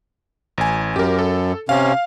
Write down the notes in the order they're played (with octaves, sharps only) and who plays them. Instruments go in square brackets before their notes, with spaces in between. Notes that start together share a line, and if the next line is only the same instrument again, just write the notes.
[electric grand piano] A1 G#5
[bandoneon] F#2 [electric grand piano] G4 A#4
[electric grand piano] A4
[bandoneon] C3 C#4 [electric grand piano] F5